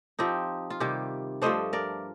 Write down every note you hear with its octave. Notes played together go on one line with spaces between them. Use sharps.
F3 C4 D#4 G4
F4
C3 D#3 G3 G4
G2 F3 A3 D4 C5 D#5
A#4 D5